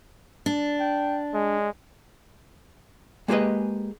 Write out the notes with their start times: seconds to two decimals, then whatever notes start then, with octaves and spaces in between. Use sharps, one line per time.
0.46 D4
0.80 G5
1.34 G#3
3.28 G#3 A#3 G4 G#4 B4 D#5